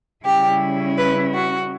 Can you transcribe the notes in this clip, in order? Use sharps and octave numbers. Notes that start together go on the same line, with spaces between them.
C#3 G3 C#4 E4 G4
B4
F#4